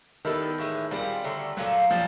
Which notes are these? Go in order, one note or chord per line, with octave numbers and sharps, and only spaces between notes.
D#3 G3 B3 E4 A4
A2 E3 G#3
A#2 F3 G3 G#3 C4
D3 F#3 A3
A#2 F3 F#3 A3 D4
A#2 F3 G3